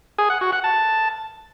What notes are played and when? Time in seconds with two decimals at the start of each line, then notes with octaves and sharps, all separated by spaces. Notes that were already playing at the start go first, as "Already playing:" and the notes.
0.18 G#4
0.30 F#5
0.41 F#4
0.52 F#5
0.64 A5